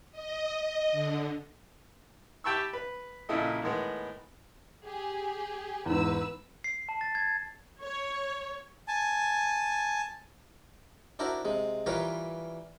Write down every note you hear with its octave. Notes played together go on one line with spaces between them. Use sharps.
D#5
D#5
D3
G4 G5 A5 B5 C#6 E6
B4
A#1 A#2 C#3 E4 A4 D#5
A2 D#3 G#3 B3
G4 G#4
E2 G#2 B4 E6
C7
A5
A6
G#6
C#5
G#5 A5
D4 E4 F#4 A#4 C5
C3 G#3
E3 G3 F4 A#4 B4 C#5